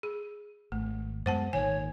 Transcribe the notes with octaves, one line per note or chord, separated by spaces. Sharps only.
G#4
G#1 A3
F#2 G#3 B3 C5 F#5 A5
G#1 A#2 D#3 C#5 G#5